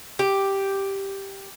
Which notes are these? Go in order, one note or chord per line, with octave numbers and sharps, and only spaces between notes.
G4